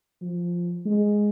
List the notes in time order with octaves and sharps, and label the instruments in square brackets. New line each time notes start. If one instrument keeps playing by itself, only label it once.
[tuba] F3
G#3